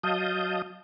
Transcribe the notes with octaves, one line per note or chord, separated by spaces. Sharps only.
F#3 D#5 F5 A5 D#6 G6